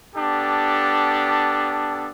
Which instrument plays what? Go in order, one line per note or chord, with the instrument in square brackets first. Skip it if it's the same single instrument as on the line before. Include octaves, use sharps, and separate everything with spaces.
[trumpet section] B3 D4 G4 A4